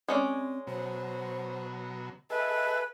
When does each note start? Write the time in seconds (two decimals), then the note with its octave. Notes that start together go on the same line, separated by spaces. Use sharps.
0.08 G#3 C4 C#4 D5
0.67 B2 F#3 C5
2.30 G#4 A4 B4 D#5 E5